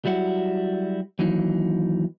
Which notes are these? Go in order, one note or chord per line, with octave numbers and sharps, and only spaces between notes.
F#3 G3 E4 F#4
D#2 E3 F#3 D#4